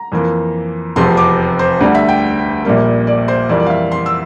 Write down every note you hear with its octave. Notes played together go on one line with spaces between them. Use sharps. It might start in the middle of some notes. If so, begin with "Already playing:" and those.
Already playing: A#5
F2 E3 A#3
F1 E2 C3 F3 C4 C6
D6
C5
D2 D3 G3
E5
G5
A#1 A#2 G3 A#3
D5
C5
F2 E3 G3 A#3 D5
D5
F5
E5
C6
E6